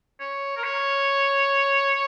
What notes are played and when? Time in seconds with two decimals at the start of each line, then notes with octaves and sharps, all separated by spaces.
0.20 C#5
0.57 A#4
0.63 C#5